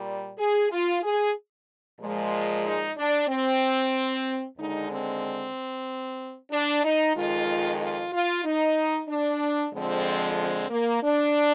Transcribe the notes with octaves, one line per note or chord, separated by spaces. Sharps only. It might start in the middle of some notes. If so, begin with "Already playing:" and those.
Already playing: A#2 G3
G#4
F4
G#4
A#2 F3 G#3
D#4
D4
C4
D#2 D3 G#3 D#4
C4
D4
D#4
F2 D#3 G#3 F4
F4
F4
D#4
D4
F2 D3 F3 G#3 C4
C4
A#3
D4